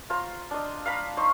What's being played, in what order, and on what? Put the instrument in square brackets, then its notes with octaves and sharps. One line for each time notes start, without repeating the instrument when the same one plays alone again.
[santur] F4 C5 A#5
D4 D#5
F5 A#5 B5
D#4 C5 C#6